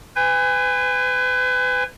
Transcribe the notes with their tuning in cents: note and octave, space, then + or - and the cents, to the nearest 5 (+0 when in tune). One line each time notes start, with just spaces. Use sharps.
B4 +35 G#5 -25